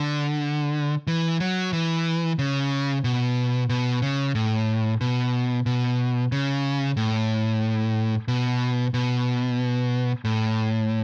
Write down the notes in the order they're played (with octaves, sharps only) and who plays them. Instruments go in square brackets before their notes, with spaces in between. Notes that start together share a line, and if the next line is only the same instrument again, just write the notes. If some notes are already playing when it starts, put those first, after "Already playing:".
Already playing: [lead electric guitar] D3
E3
F#3
E3
C#3
B2
B2
C#3
A2
B2
B2
C#3
A2
B2
B2
A2